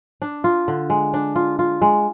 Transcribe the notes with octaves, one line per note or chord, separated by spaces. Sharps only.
D4
F4
D3
G#3
D4
F4
F4
G#3